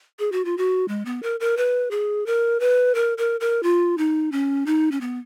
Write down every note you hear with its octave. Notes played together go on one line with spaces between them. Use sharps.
G#4
F#4
F4
F#4
G#3
B3
A#4
A#4
B4
G#4
A#4
B4
A#4
A#4
A#4
F4
D#4
C#4
D#4
C#4
B3